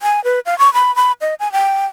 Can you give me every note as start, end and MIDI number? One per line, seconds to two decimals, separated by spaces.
0.02 0.23 80
0.24 0.40 71
0.46 0.57 77
0.59 0.72 85
0.74 0.94 83
0.96 1.12 83
1.21 1.34 75
1.40 1.51 80
1.52 1.86 79